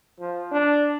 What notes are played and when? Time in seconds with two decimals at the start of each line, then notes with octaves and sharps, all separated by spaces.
0.20 F3
0.52 D4